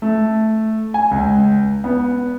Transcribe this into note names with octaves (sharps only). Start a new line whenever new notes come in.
A3
G#5
C#2
B3